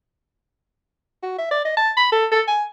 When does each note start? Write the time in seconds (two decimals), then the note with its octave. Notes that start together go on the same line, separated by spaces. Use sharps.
1.23 F#4
1.38 E5
1.51 D5
1.65 D#5
1.77 A5
1.97 B5
2.12 A4
2.32 A4
2.48 G#5